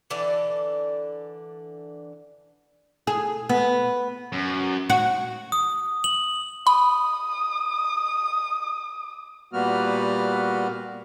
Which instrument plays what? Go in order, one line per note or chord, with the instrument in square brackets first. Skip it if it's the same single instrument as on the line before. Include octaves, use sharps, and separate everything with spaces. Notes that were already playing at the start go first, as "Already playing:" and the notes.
[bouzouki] D3 E3 D4 A4
[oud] G#4
B3
[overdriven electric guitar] F#2
[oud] F#4
[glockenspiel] D#6
F#7
[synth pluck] B5 [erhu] D#6
[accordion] A#2 G3 A#3 B3 F#4 F6